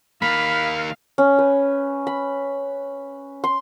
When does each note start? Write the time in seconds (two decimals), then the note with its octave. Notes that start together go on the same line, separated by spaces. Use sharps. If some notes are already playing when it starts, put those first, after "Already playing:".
0.22 D#3 A#3 F5 B5
1.18 C#4
1.39 B4
2.07 B5
3.44 C6